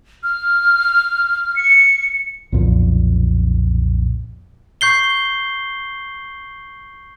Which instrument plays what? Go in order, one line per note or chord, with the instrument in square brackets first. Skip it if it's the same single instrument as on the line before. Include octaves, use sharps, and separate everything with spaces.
[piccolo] F6
C#7
[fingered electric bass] B1 F2 A#2 F3
[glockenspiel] C#6 G6 C7 G7